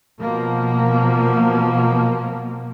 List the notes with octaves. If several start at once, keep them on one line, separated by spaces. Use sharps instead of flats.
B2 F3 A#3